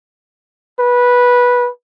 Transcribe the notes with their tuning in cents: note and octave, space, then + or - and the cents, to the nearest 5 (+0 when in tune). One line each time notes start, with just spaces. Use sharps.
B4 -15